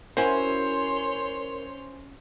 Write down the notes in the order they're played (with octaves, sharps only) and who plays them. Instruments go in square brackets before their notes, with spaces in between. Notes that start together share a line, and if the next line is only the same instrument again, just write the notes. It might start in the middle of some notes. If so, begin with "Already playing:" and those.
[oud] C#4 E4 F#4 [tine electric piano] A#4 [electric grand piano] C5 G#5 [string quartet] C#5 C6